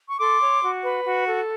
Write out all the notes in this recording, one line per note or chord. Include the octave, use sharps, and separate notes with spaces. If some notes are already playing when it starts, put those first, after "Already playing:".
C#6
A4 C6 D6
C#5
F#4
B4
F#4
A4